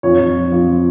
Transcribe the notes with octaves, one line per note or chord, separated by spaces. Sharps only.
F2 C#5
F2
F3
F2
F3